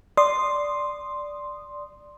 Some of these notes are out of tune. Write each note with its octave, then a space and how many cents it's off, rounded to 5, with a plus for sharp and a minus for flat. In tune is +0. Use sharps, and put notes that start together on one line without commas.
D5 +0 C6 +0 D#6 -15